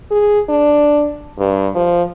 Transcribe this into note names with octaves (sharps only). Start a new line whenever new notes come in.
G#4
D4
G2
F3